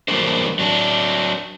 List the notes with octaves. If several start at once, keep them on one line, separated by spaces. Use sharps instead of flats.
E3 F#3 G3 A#3 D4 C5
F#3 D4